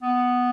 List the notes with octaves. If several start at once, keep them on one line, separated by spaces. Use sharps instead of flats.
B3